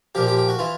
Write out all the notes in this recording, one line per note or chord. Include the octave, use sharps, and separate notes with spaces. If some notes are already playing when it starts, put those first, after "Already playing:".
A#2 F3 G4
G4
G4
F#4
E3 F4